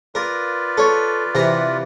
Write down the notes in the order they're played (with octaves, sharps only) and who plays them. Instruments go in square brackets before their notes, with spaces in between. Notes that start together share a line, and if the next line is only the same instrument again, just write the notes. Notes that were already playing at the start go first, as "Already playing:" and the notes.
[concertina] F4 B4 D5 [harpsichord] A#4
[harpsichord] A4 C#5
C3 E3 A#5